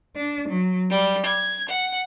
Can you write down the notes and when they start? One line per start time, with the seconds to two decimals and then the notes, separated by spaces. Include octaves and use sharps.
0.15 D4
0.49 F#3
0.90 G3
1.25 G#6
1.68 F#5